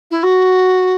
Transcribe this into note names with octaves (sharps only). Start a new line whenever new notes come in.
E4
F#4